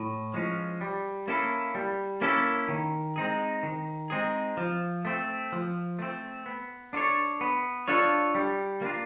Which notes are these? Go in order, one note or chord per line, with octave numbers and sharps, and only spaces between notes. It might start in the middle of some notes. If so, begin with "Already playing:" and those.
Already playing: A2
F3 G#3 C#4
G3
A#3 C#4 E4 A4
G3
A#3 C#4 E4 A4
D#3
G#3 C4 D#4 G#4
D#3
G#3 C4 D#4 G#4
F3
A3 C4
F3
A3 C4
B3
D4 F4 A4 C#5
B3
D4 F4 A4 C#5
G3
A#3 D4 F4